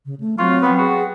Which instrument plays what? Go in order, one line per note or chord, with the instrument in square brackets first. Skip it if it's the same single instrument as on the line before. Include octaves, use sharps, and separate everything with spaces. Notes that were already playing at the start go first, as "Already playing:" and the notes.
[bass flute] C#3
A3
[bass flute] F#3 [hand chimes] C4 C#6 [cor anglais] F4
[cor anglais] B3 [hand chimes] B4 F#5 G5
[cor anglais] F#4 [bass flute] G#4